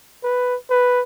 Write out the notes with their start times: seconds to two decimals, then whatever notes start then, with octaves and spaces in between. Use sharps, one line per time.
0.23 B4
0.70 B4